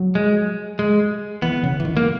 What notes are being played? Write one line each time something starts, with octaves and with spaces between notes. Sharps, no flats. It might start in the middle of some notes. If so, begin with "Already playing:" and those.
Already playing: F#3
G#3
G#3
E3 B3
C#3
E3
D#3
A#3